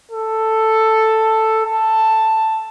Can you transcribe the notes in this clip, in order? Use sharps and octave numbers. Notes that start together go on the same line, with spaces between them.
A4
A5